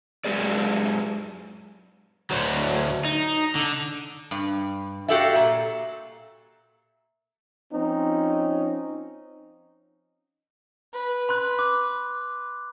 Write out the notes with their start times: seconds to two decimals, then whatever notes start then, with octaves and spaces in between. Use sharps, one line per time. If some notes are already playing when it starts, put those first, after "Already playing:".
0.25 F#2 G#3 G4 G#4 D5
2.30 D2 F#3
3.05 D#4
3.55 D3
4.31 G2
5.08 F#4 G4 A4 D5 E5 F5
5.35 A#2
7.73 F3 C4 C#4 D#4
10.93 B4
11.29 B5 C6 F#6
11.59 D6